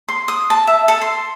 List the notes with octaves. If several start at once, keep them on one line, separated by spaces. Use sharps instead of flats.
C6
D#6
A5
E5
A4
C6